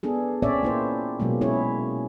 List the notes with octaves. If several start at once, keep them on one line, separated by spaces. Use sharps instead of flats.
B3 D4 G#4 A4
A#2 C4 C#4 C#5 D5 E5
A#3 E4 C5
B2 F#3 G#3 A#3
C#4 E4 G#4 C#5